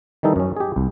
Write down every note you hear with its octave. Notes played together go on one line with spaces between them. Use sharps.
D#3 E3 G3 D#4 A4
F#2 C#4
G4 G#4
C2